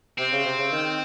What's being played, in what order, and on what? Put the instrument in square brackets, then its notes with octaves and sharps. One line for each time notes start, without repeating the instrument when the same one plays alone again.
[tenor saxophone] C3 [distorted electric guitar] C4
[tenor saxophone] C#3
C3
C#3
D#3